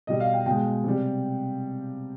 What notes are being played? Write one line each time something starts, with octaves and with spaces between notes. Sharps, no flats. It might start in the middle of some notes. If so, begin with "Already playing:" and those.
B2 G3 D#5
F5
G5
B2 G#3 G5
C3 G3